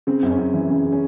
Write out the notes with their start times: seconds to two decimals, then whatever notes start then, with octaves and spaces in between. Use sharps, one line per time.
0.07 C#3 C4
0.23 F#2 C4
0.30 C#4
0.39 F#2
0.54 E3
0.70 C#3
0.85 C#3
0.92 C#4